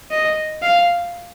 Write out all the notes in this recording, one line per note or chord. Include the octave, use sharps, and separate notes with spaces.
D#5
F5